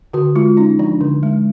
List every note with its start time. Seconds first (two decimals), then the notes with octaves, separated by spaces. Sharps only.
0.13 D3 F#4
0.35 G#3 F4
0.57 C#4 D#4
0.79 F3 D4
1.01 D3
1.23 G#3